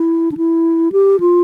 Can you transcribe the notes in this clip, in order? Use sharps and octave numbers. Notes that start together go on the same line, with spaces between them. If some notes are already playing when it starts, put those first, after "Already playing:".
Already playing: E4
D4
E4
G4
F4